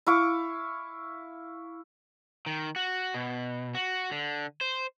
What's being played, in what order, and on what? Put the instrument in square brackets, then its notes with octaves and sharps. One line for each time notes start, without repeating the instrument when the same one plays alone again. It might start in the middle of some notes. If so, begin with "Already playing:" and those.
[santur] E4 F5 C#6 D6
[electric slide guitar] D#3
F#4
B2
F#4
D3
C5